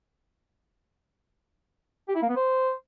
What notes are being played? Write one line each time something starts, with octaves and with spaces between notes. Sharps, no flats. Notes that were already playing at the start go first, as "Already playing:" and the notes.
G4
E4
A#3
B3
C5